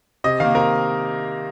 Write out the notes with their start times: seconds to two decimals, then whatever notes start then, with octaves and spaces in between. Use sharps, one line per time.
0.24 C3 D#5
0.40 D#3 A#3 F5
0.55 C3 A#4